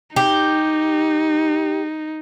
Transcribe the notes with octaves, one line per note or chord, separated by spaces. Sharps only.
D#4 G4